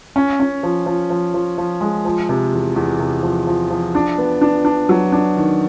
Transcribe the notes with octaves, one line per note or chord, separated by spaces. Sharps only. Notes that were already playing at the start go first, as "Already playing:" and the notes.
C#4
C#4
F3
F3
F3
F3
F3
G#3
F3
C3
E2
E2
C3
F3
F3
F3
D4
B3
D4
D4
F#3
D4
D#3